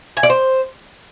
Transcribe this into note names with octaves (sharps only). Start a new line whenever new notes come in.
G#5
D5
C5